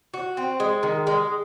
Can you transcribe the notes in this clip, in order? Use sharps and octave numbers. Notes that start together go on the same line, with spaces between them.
F#4
C4
G#3
D#3
G#3